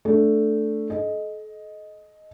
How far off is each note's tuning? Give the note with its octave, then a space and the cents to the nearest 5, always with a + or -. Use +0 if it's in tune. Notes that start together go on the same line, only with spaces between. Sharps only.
A3 +0 D4 +0
A4 -40 D#5 +0